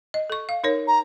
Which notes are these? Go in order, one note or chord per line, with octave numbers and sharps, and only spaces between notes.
D#5
A4 C#6
F5
D#4 A#4 C#5
A#5